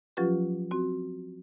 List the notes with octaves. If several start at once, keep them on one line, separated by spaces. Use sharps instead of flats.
F3 F#3 C#4 F4 G4 B4
C4 F#4